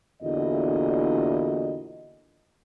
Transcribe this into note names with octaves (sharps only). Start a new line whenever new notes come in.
E2 A#2 D3 E4 F#4 D#5